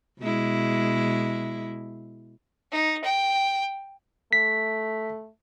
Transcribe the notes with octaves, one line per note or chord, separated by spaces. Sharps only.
B2 G#3 E4
D#4
G5
A3 B6